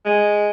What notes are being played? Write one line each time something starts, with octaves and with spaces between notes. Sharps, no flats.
G#3